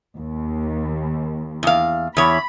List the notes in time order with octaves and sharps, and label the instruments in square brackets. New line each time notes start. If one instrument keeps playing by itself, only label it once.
[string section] D#2
[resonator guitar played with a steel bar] E2 F5
[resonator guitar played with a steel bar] E2 C#5 [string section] B5